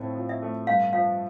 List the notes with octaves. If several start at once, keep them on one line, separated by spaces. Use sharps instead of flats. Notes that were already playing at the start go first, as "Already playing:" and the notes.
Already playing: A2 F3 A3 C4
F3
E5
A3
G2 F5
F3 F5